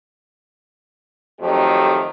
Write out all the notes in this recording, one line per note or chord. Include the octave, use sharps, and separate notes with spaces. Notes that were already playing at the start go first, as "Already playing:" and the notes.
F2 D#3 F#3 A3 G4